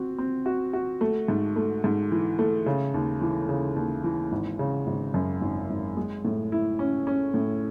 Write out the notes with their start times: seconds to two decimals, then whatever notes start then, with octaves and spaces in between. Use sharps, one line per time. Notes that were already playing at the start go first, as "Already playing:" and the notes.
Already playing: C4 F#4
0.18 C4
0.46 F#4
0.73 F#4
1.01 A3
1.28 G#2
1.56 A3
1.84 G#2
2.11 E3
2.39 A3
2.66 C#3
2.94 D#2
3.21 E3
3.49 C#3
3.76 D#2
4.04 E3
4.32 G#1
4.59 C#3
4.87 G#1
5.14 F#2
5.41 G#1
5.70 G#1
5.97 G#3
6.25 A2
6.52 E4
6.79 C#4
7.07 C#4
7.34 A2